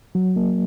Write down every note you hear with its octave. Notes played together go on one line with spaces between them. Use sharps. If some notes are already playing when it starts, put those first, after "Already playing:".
F#3
A#3